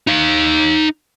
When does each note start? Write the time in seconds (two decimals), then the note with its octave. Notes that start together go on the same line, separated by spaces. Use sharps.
0.07 D#4 F5